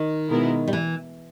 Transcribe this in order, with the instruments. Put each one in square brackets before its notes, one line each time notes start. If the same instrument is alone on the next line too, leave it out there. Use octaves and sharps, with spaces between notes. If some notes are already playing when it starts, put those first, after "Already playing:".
Already playing: [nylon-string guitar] D#3
[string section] B2 G#3 B3 E4 A#4
[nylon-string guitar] G3
E3